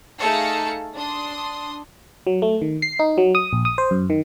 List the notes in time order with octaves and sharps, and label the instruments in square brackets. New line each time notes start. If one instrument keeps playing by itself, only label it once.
[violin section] A3 D#4 G#4 A4 F5 C#7
D4 C6 D#6
[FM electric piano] F#3
A3
D#3
C7
D#4
F#3
D#6
A#1
D#6
C5
F#2
D#3